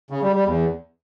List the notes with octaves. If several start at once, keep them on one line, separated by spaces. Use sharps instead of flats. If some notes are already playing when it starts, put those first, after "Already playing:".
C#3
G3
G3
E2